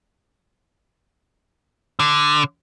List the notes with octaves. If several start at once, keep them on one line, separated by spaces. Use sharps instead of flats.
D3